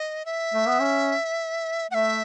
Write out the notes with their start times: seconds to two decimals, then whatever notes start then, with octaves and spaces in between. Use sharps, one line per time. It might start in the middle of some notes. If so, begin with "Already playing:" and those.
Already playing: D#5
0.25 E5
0.54 A3
0.67 B3
0.80 C#4
1.91 A3 E5 F#5